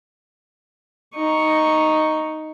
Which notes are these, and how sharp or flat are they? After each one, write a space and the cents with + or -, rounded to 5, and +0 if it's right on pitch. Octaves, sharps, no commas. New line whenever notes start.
D#4 +0 C#6 +0